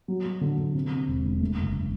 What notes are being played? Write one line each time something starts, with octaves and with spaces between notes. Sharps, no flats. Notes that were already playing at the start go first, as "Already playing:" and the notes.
F#3
F#3
D3
D3
C3
C3
E1
E1
A3
F#1